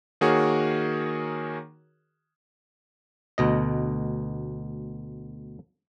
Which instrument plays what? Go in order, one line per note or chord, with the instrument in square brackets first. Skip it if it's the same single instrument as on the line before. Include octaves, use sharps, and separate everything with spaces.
[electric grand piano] D#3 A#3 F#4 G#4 A#4 C#5
[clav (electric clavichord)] D2 B2 D#5